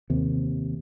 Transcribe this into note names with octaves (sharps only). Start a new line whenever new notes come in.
D#2 C3